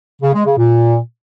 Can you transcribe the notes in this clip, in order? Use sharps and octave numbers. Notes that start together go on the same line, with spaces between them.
C#3
G#3
C#3
A#2